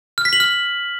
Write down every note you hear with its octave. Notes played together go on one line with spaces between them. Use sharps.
F6
B6
F#7
F6